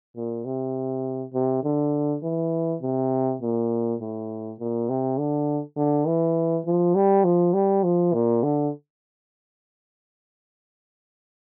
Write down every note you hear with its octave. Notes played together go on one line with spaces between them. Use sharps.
A#2
C3
C3
D3
E3
C3
A#2
A2
A#2
C3
D3
D3
E3
F3
G3
F3
G3
F3
A#2
D3